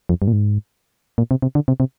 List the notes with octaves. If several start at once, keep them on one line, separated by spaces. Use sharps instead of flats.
F2
G2
A#2
G#2
A#2
C3
C3
D3
C3
C3